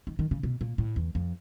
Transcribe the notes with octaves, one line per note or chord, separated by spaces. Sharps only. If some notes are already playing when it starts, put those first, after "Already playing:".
D#3
D#3
C#3
B2
A#2
A2
E2
F2